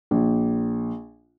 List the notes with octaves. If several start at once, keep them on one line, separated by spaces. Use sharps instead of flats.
A#1